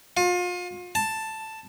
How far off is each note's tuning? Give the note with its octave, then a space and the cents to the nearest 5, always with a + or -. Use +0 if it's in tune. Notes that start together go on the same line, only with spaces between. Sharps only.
F4 +35
A5 +5